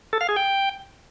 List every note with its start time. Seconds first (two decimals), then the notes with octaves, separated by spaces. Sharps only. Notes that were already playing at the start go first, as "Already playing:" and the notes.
0.13 A4
0.21 F5
0.29 G#4
0.36 G5